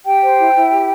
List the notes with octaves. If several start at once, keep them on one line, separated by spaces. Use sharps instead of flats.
G4 G5
C5
E4
E4
G4